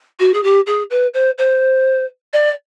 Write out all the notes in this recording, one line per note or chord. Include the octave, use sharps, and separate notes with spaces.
F#4
G#4
G4
G#4
B4
C5
C5
D5